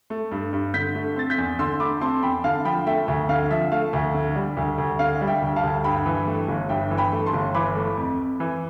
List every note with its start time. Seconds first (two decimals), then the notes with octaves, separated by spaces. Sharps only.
0.10 A3
0.31 G2
0.53 G2
0.74 D3 G6 B6
0.95 A3
1.16 C4 A6
1.30 G6 B6
1.38 E2
1.59 D3 C6 E6
1.80 A3 B5 D6
2.01 C4 A5 C6
2.23 E2 G5 B5
2.44 D3 F5 A5
2.65 F3 G5 B5
2.86 A3 E5 G5
3.08 D2 E5
3.29 D3 F5
3.51 F3 E5
3.72 A3 F5
3.93 D2 E5
4.14 D3
4.36 G3
4.57 D2
4.78 D2
4.99 D3 F5
5.21 G3
5.28 E5 G5
5.42 D2
5.56 F5 A5
5.63 D2
5.84 G2 G5 B5
6.06 E3
6.27 A3
6.48 G1
6.69 G2 E5 G5
6.91 E3
6.97 G5 B5
7.12 A3
7.26 A5 C6
7.33 G1
7.54 E3 B5 D6
7.76 A3
7.97 F2
8.18 F2
8.40 E3